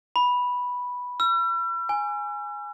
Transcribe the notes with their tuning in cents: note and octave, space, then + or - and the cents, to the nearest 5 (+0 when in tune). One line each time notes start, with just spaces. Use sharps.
B5 -5
E6 +45
G#5 -5